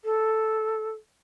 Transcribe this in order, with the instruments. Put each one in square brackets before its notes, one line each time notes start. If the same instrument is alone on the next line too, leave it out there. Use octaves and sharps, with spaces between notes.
[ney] A4